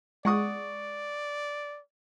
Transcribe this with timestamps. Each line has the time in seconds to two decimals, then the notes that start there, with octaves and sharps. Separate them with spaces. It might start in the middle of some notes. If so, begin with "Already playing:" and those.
0.25 G#3 D5 F#5 C#6 D#6